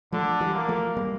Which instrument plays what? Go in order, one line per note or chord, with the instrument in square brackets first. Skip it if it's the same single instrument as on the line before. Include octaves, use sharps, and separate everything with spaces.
[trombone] D3 [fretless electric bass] F3 A3
[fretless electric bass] E3 G3
[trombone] A#3
[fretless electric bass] F3 A3
G3 A#3